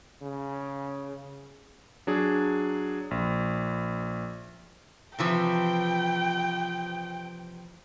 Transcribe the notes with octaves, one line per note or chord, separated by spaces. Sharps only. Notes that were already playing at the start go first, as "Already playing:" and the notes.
C#3
F#3 D4 G#4
A#1
C3 E3 F3 G5